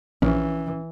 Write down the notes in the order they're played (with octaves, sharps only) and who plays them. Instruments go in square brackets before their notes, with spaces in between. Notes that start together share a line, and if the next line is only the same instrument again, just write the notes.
[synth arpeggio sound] A#1 [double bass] E3 [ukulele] C#4